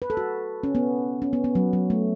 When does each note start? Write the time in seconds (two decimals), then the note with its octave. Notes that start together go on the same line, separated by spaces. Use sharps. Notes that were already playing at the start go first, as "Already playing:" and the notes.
0.02 B4
0.10 A4
0.17 F#4
0.63 C#4
0.75 B3
1.22 C#4
1.33 B3
1.44 B3
1.55 F#3
1.73 F#3
1.90 A3